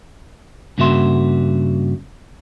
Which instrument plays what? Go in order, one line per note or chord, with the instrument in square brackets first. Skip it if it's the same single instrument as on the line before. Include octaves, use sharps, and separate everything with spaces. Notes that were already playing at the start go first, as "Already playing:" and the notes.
[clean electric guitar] G2 C#3 A#3 F#4 E5 C6